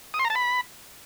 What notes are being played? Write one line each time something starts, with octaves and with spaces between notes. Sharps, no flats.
D#6
C6
A#5
A5
B5